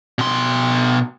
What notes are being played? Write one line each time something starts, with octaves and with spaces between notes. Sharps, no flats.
B2 C6